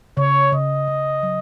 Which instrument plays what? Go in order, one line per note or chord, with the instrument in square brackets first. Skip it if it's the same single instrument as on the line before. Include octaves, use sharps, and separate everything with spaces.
[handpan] C#3 [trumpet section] C#5
[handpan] C#3 [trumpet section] D#5
[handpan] C#3
F#3